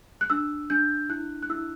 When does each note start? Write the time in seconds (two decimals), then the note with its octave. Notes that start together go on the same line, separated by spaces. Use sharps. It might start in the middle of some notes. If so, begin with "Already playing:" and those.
0.21 F#6
0.30 D4 E6
0.70 D4 G6
1.10 E4 F#6
1.42 F#6
1.49 E4 E6